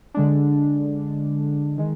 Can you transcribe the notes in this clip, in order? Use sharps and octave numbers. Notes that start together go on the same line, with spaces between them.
D3 G#3 D4
D#3 G#3